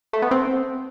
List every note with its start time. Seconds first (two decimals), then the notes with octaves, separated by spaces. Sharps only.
0.13 A3
0.22 B3
0.31 C4